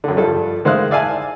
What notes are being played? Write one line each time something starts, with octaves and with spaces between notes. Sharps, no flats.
F#2 D3
G2 F3 A4
D#3 G#3 C5 E5 F5 F#6
D5 E5 F5 G#5 A5